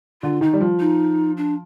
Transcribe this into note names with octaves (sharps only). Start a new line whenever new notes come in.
D3 F4
D#3 D#4
G3
F3
D#4
D4